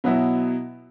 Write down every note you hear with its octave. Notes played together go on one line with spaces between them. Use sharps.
B2 F#3 B3 E4